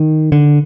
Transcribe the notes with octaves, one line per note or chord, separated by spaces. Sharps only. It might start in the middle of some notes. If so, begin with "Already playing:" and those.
Already playing: D#3
D3